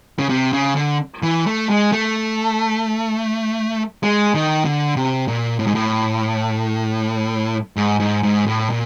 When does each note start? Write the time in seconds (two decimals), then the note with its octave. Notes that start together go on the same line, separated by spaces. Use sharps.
0.19 C#3
0.29 C3
0.53 C#3
0.76 D3
1.23 E3
1.46 A3
1.70 G#3
1.92 A3
4.03 G#3
4.34 D#3
4.65 D3
4.96 C3
5.28 A#2
5.59 A2
5.67 G#2
5.75 A2
7.77 G#2
8.00 G#2
8.23 G#2
8.46 A2
8.70 A#2